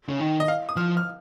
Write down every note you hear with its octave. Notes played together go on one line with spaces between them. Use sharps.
C#3
D#3
D#5
F5
D#6
F3 F6
F6